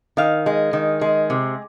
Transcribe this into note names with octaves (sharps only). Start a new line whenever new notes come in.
D#3 F5
G#3
D#3
G#3
C3